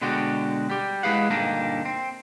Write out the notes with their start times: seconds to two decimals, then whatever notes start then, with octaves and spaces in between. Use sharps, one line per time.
0.01 B2 D3 G#3 D4 F#4 G4
0.70 G3 G4
1.03 G#3 E4 G#4 B4 F5 F#5
1.30 G2 A#2 D3 A#3 D4 D#4
1.85 C4